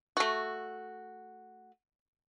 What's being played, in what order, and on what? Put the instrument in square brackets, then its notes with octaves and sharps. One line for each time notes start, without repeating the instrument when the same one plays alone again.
[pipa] A3 F#4